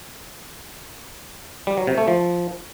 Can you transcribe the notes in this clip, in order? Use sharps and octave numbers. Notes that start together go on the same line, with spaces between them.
G3
F#3
C3
A3
F3